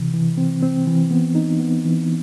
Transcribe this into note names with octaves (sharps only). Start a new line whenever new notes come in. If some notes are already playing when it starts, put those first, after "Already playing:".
Already playing: C3 E3
E3
C4
C4
E3
B3
D#4
B3
E3